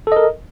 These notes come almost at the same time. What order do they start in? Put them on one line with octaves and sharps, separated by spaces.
A4 D#5 A#4